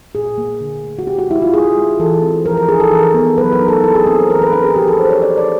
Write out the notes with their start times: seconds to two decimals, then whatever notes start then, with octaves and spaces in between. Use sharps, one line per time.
0.15 A#2 G#4
0.38 A#3
0.61 D3
0.84 A3
0.99 F#4
1.07 C#4 G4
1.19 F#4
1.30 G#3 E4
1.42 F4
1.53 C#4 G#4
1.76 G#3
2.00 E3 A4
2.22 C4
2.45 F3 A#4
2.57 A#4
2.68 D#4 G#4
2.80 A4
2.91 E3 A#4
3.14 B3
3.38 F#3 B4
3.53 A#4
3.61 D#4
3.68 A4
3.84 E4 A4
3.95 G#4
4.06 C4 A4
4.19 A#4
4.29 E3 A#4
4.42 B4
4.53 D4 A#4
4.64 G#4
4.76 F3 G4
4.88 A4
4.99 D#4 C5
5.11 C#5
5.22 C#4 D5
5.37 D5